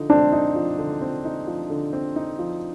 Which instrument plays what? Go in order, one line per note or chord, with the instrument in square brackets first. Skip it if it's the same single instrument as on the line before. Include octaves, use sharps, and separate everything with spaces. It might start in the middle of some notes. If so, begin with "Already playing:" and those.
Already playing: [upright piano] D3 F3 D#4
[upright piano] C4 [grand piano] D4
[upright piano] D#4
F3
D3
C4
D#4
F3
D3
C4
D#4
F3